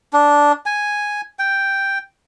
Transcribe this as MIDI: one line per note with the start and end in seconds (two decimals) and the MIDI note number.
0.13 0.52 62
0.66 1.21 80
1.39 1.98 79